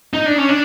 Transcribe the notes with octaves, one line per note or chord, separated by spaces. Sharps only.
D#4
D4
C#4
D4